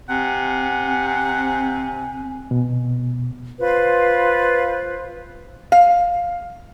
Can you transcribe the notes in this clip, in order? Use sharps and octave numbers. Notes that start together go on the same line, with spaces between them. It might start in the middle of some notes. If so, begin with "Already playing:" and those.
C3 C4 F#5 G#5
B2
F4 B4 C5
F5